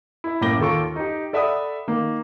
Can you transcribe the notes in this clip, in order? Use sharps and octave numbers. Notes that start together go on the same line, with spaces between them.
E4 E5
F#2 A2 A#3 D6 A#6 G7
D#2 F4 A4 C#6 D7
D#4 G4
A4 D5 E5 F#5 B5 D#6
D#3 A#3